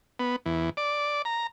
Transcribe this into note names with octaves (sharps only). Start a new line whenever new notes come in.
B3
E2
D5
A#5